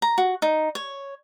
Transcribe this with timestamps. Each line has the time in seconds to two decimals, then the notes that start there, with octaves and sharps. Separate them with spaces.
0.02 A#5
0.18 F#4
0.42 D#4
0.75 C#5